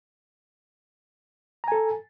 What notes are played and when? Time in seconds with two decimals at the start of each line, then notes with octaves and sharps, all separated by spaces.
1.64 A#5
1.68 G#5
1.72 A4